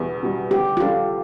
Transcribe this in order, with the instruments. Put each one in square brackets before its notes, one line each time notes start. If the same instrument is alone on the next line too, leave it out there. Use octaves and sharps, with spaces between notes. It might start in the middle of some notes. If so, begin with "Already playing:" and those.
Already playing: [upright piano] E2 B2 G3
B2 G3
[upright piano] D3 [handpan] G4
[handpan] F4
[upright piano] G3 D4 A4 [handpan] G4